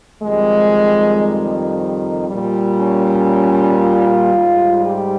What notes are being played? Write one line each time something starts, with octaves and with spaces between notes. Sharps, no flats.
F2 D#3 G3 G#3
A#2 G3
C#4
F4
G#2 G3
G4